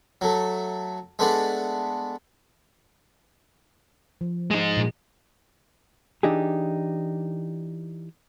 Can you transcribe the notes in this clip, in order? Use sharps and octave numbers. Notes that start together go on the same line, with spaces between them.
F#3 A3
G#3 A3 B3 D4 F#5
F3
G#3 D#4
A#2
E3 D4 D#4 G4 G#4